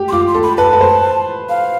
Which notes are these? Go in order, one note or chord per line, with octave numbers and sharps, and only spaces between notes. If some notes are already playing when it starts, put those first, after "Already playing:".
Already playing: G4
C6
F4 D6
C6
A4
B5
B4 A5
B4
C5
F5